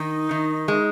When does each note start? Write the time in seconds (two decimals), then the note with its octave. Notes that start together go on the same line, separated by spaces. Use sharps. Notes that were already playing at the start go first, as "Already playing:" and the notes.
Already playing: D#3 D#4
0.31 D#3
0.68 G#3